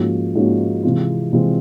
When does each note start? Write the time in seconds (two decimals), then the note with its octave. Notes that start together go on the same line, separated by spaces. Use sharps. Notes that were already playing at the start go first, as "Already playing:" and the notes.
Already playing: G#2 F3 A#3 C#4 F#4
0.35 G#2 F3 A#3 C#4 F#4
0.83 C3 E3 G#3 C4 F4
1.33 C3 E3 G#3 C4 F4